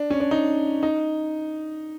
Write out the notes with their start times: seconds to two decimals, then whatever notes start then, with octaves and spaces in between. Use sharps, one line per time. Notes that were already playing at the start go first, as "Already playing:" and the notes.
Already playing: D4
0.10 C#4
0.20 D4
0.31 D#4
0.83 D#4